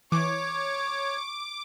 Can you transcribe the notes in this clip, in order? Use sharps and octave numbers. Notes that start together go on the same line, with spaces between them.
E3 C#5 C#6 D6